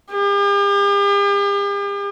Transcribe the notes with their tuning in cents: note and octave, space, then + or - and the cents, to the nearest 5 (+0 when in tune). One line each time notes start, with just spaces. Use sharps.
G4 +45